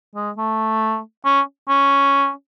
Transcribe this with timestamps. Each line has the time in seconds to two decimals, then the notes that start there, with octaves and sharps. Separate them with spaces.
0.15 G#3
0.38 A3
1.25 C#4
1.69 C#4